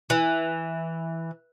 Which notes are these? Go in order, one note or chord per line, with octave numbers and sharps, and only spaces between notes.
E3